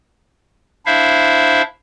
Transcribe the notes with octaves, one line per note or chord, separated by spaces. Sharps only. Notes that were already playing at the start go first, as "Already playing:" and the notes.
D4 E4 C5 E5 F5